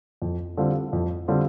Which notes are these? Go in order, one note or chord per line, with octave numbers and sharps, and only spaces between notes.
F2
D3 G3 C4 F4
F2
D3 G3 C4 F4